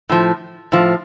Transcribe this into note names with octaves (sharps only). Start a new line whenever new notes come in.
A2 F3
A2 F3